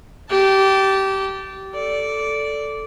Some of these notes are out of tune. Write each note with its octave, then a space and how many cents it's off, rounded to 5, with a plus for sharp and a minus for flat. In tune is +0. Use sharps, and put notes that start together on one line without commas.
G4 -20 A5 +0
A4 +0 D5 -15